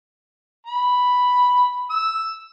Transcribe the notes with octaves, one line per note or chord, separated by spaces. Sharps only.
B5
E6